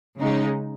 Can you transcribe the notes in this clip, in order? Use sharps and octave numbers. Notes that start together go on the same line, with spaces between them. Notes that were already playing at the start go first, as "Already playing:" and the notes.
C#3 G#3 D#4